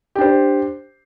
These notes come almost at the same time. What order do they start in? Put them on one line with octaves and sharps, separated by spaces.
G4 D4 C5